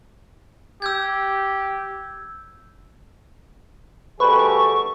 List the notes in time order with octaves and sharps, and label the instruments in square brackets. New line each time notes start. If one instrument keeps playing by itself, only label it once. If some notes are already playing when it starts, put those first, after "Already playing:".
[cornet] G4 [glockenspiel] E6 G6 G#6
[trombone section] D2 G3 G#4 [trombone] A4 [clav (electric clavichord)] B4 [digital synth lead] C#6